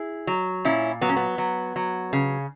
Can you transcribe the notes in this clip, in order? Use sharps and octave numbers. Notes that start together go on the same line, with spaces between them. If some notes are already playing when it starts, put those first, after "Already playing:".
Already playing: E4 G#4
F#3
A#2 C#4 E4
F#3 B3
C#4
B3
F#3
F#3
C#3